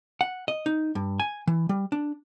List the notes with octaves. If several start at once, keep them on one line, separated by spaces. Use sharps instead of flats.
F#5
D#5
D#4
G2
G#5
E3
G3
D4